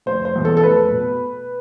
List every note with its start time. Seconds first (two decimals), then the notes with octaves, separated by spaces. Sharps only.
0.06 F1 C5
0.25 C5
0.36 E2 B2
0.45 A4
0.57 A4
0.63 F1 B4
0.92 B2